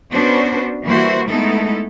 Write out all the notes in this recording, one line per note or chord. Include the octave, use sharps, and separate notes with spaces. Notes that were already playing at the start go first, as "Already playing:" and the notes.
B3 C#4 D4 F#4 B4 C5
E3 G3 A#3 E4 F#4 C5
G#3 A3 B3 D#4 E4 A4